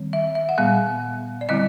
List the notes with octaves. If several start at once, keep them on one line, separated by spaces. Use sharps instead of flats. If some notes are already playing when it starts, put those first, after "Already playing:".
Already playing: D#3 G3 C4
E5
E5
F#5
A#2 G3 B3 F5
D5
D3 G3 C4 E4 D#5